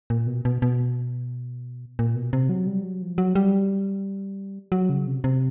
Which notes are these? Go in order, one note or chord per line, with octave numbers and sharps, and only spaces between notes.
A#2
B2
B2
B2
A#2
B2
C3
F#3
G3
F#3
F3
F#3
G3
F#3
C#3
C3
C3